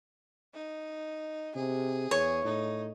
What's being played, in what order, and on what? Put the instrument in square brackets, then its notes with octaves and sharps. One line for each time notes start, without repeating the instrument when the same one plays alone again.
[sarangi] D#4
[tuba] C3 [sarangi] G#4
[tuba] E2 [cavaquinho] C#5
[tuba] A2 [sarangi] D#4